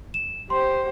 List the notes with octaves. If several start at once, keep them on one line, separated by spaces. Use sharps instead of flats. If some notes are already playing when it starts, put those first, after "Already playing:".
E7
G4 C5 C6